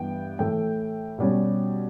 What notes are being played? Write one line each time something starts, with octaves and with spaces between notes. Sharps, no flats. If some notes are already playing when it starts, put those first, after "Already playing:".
Already playing: G2 E3 B3 G5
A2 E3 A3 G5
B2 G3 C#4